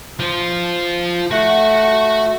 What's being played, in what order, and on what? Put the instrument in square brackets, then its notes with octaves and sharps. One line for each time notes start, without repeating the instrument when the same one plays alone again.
[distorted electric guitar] F3 F4
[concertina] A3 [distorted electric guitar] F#4 F#5